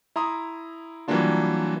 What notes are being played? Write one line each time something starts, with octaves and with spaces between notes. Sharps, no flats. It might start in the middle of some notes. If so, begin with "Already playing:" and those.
E4 A#5 C6 D#6
E3 F#3 G3 A#3 D4 F4